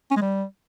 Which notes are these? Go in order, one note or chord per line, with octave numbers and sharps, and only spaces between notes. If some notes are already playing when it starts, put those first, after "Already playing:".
C#4
G#3
G3